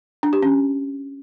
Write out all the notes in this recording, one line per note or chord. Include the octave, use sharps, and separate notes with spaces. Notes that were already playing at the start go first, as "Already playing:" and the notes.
D4
G4
C#4